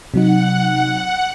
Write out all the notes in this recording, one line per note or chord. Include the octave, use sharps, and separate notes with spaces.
C3 F#3 D#4 F#5